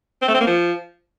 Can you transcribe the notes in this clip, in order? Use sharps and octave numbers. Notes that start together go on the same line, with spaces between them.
C4
A3
C4
A#3
F3